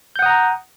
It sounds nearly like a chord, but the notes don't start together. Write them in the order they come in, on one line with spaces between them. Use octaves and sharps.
G6 F#5 D#6 A#5